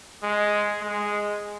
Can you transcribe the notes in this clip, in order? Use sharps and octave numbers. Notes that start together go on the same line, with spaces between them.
G#3
G#3